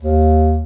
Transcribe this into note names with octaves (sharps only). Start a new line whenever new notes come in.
D#2